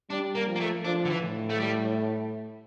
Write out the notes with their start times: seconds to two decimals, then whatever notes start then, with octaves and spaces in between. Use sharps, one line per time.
0.10 G3 D4
0.35 A#3
0.48 F3
0.56 A#3
0.60 A3
0.84 F3 D4
1.05 D3
1.10 E3
1.22 A2
1.50 A3
1.60 G3